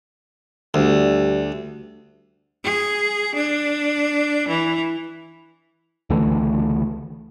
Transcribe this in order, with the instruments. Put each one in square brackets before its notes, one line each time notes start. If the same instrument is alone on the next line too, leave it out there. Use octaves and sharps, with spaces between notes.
[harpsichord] D2 [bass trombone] G3
[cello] G#4
D4
E3
[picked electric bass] C#2 D3 E3 A3